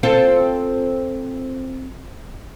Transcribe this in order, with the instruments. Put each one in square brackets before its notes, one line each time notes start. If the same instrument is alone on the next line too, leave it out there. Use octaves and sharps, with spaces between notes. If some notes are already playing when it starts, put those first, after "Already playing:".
[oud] C4 F4 A4